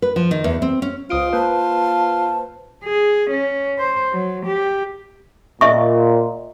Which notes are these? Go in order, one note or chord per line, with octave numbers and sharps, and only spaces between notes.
B4
F3
D#3
E2
C4
C#4
C#2 F4 C5 D#6 D7
A#3 B4 C5 A5
G#4
C#4
C5
F#3
G4
A#2 D#5 E5 C#6